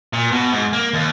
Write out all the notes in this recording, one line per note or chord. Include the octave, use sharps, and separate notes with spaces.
A#2
B2
G#2
A#3
D#2